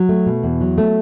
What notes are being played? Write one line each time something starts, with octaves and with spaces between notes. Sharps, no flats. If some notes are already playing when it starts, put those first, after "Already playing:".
Already playing: F#3
A3
B2
E2
F#3
A3